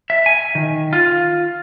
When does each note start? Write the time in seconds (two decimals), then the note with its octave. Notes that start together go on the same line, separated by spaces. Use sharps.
0.10 E5
0.26 G#5
0.55 D#3
0.93 F4